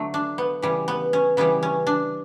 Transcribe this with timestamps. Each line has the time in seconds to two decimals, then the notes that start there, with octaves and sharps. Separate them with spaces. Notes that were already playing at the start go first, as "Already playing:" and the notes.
Already playing: D3 F#3 A3
0.14 D4
0.38 B3
0.62 C#3 E3 G3
0.88 B3
1.13 C#4
1.37 C#3 E3 G3 B3
1.63 C#4
1.87 D4